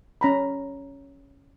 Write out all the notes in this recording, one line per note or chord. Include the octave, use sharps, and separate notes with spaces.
C#4 A#5 B5